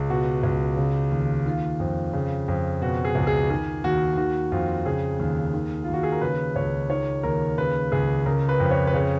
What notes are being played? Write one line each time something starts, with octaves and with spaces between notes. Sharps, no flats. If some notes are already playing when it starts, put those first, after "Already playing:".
Already playing: C#2
B2 F#4
C#2
C#3
D#2
D#3 F4
F2
C#3
F2
B2 F#4
G#4
C#2
G#4
D#3 G#4
D#2 F#4
D#3 F#4
F2 F4
C#3 G#4
D#2
D#3
F4
D#2
F#4
G#4
A#4
C#3 B4
C#2 C#5
D#3 C#5
D#2 A#4
C#3 B4
C#2 G#4
C#3 A#4
B4
F2
C#5
B4
C#3 C#5